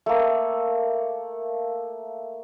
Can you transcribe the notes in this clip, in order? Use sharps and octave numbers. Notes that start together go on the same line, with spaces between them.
A3 A#3